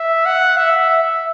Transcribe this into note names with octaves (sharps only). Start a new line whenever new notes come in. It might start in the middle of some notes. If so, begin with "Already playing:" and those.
Already playing: E5
F#5
E5
E5